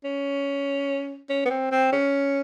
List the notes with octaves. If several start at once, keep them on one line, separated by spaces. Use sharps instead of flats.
C#4
C#4
B3
C4
C4
C#4